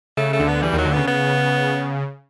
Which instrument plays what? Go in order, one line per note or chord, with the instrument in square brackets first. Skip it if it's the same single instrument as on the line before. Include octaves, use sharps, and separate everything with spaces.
[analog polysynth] C#3 [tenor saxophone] A3
[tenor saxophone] A3
[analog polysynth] D2 D3
[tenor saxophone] B3
[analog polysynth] E2 E3 [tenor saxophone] G3
[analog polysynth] D#2 D#3 [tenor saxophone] F#3
[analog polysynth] D2 D3
[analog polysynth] C#3 [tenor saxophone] B3
[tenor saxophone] B3